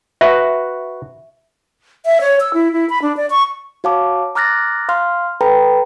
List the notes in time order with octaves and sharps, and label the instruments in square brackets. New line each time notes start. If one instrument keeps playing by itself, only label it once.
[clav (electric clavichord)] F#4 B4 [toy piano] E5
[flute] E5
C#5
E6
E4
E4
B5
D4
D5
C#6
[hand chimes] F#4 C#5 F5 A5 D6
A#5 D6 F6 F#6 A6 A#6
F5 C6 F6
A4 B4 G5 A#5 B5